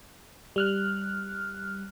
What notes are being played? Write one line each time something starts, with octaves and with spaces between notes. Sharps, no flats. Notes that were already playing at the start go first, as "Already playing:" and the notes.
G3 F6 F#6